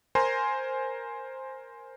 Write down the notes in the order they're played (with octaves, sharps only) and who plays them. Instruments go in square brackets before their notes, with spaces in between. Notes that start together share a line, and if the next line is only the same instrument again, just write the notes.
[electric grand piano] A#4 C5 G#5 A#5 C6